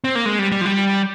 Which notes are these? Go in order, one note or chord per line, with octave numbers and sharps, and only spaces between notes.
C4
A#3
G#3
G3
G3
F3
G3